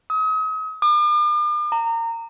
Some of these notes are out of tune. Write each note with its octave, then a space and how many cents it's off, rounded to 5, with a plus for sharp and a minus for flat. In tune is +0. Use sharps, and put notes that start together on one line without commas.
D#6 +40
D6 +45
A#5 -25